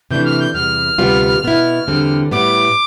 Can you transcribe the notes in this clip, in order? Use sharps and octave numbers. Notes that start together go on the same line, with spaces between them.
C3 E3 A3 D4 G6
F6
G6
E2 C3 G3 F6
D2 C3 G3 B3 F4
B2 B3 E4
E2 D3 G3 C4
A2 G3 B3 D6